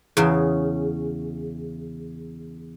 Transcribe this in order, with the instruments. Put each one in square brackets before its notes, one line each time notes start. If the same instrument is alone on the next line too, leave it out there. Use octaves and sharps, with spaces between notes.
[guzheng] E2 C#3